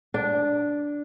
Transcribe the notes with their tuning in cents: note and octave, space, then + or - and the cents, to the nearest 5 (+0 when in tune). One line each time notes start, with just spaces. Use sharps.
D4 -5